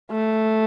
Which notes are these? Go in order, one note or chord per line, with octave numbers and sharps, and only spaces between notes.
A3